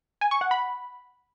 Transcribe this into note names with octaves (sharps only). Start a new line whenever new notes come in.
G#5
C#6
F#5
B5